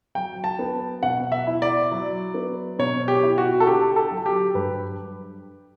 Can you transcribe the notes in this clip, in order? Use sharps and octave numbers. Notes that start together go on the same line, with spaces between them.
F#3 G5
A5
B3
B2 F#5
E5
E4
D5
F#3
B3
B2 C#5
G4
E4
F#4
A4
D3 G4
A4
F#3
G4
G2 B4